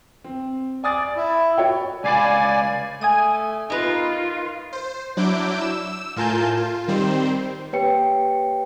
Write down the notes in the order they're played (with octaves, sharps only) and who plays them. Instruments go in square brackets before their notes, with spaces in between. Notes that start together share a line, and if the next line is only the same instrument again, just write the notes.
[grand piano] C4
[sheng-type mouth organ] D5 [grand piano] G#5 D#6 A6
[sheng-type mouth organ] E4
[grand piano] F#4 C#5 G5
[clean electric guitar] C#2 F5 B5 [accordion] D5 G#5
[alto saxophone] A3 [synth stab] G#5 D#6 D#7
[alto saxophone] D#4 [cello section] F4 [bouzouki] A#4 B4
[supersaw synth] C5
F#3 D4 E4 D6 G6 D7
E6 E7
A2 F4 A#4 G#5 A5 G6
F4
D#3 G3 C4 C5
[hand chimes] A#3 G4 B4 C#5 G5 C#7